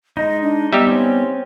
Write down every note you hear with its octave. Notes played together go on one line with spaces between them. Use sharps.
G#3 D#4 D#5
D4
G3 B3 D#4 G4 E5
C4 C#4